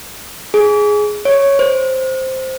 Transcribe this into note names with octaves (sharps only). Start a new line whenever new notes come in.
G#4
C#5
C5